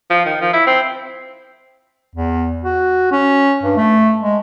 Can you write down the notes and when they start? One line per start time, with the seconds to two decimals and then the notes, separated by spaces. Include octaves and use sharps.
0.10 F3
0.25 D#3
0.41 F3
0.53 E4
0.67 C4
2.15 E2
2.64 F#4
3.12 C#4
3.63 G2
3.77 A3
4.22 G#3